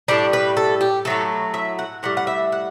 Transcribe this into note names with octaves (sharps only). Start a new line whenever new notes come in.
A2 G3 D4
B4
A4
G4
A2 F#3 A3 A4
E5
F#5
A2 G3 F#5
F#5
E5
F#5